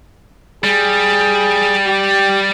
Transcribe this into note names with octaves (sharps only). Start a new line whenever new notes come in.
G3 G#4
G4